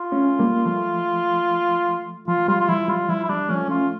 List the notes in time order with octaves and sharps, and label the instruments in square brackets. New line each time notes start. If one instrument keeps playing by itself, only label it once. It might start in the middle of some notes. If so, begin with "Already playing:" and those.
Already playing: [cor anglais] F4
[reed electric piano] A3 C#4
G3 A#3
F3 A3
[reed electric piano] F3 [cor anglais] F4
[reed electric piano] G3 [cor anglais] F4
[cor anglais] F4
[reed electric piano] F3 [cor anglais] E4
[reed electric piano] G3 [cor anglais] F4
[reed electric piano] F3 [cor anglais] E4
[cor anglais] E4
[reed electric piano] G3 [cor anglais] D4
[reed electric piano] F3 A3 [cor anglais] C#4
[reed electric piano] A3 C#4 [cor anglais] F4